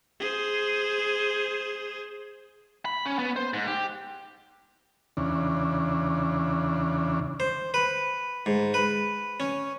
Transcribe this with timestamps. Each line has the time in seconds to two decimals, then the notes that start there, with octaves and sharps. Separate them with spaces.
0.20 G#4 C5
2.85 B5
3.06 C#4
3.19 B3
3.36 C5
3.53 G#2
3.67 G4
5.17 E2 C#3 D4
7.40 C5
7.74 B4
8.46 G#2
8.74 B4
9.40 C#4